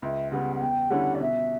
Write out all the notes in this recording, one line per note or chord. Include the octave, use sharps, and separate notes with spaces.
C#2 E5
C#3 G3 B3 F#5
F#5
E2 G5
D3 G3 C#4 E4 F#5
D5
B2 E5